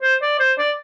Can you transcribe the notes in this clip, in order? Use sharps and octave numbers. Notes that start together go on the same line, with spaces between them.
C5
D5
C5
D5